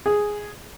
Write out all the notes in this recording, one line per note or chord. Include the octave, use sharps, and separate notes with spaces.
G#4